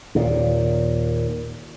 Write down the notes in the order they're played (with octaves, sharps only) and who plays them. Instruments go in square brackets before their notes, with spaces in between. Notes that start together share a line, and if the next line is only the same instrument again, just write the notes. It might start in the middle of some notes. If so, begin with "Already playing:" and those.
[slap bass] D#2 A#2